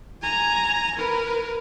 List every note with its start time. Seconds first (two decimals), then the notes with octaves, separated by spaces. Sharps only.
0.22 G#5 A#5
0.96 A#4 B4